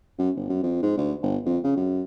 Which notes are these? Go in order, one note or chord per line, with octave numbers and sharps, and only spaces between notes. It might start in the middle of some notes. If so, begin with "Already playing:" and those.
F#2
G1
F#2
F2
G#2
D2
G1
F2
C#3
F#2